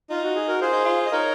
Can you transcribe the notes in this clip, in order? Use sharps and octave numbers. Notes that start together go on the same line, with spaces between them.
D#4 F4
F#4
G#4
F#4 A#4
F4 G#4 C5
D#4
F4
D#5
D#4 A#4 C#5